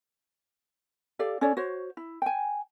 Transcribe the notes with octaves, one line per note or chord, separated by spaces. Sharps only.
G4 A4 D5 F5
C#4 A4 C#5 D5
F#4 C5 C#5
E4
G5 G#5